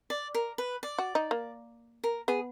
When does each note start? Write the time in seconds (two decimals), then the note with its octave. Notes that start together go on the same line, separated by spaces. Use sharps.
0.10 D5
0.35 A#4
0.58 B4
0.83 D5
0.98 F#4
1.15 D#4
1.31 A#3
2.04 A#4
2.28 B3 G#4